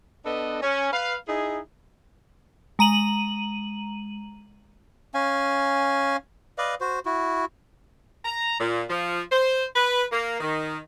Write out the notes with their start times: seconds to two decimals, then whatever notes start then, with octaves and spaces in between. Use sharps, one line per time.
0.24 B3 D4 A4 B4 D#5
0.61 C#4
0.92 B4 F5
1.27 D#4 E4 G#4
2.79 G#3 A#5 D#7 F#7
5.14 C#4 F5 G#5
6.58 B4 D5 D#5 F5
6.81 F#4 C5
7.05 E4 F#4
8.25 A#5
8.60 A#2
8.89 F3
9.32 C5
9.75 B4
10.12 A#3
10.40 D#3